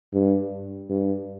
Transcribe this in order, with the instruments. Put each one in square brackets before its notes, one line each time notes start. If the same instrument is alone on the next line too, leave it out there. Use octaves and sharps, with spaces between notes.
[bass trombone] G2
G2